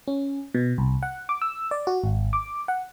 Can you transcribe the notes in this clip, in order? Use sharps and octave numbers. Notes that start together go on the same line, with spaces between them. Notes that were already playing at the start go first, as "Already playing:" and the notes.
C#4
B2
C2
F#5
D6
E6
D5
F#4
G#1
D6
F#5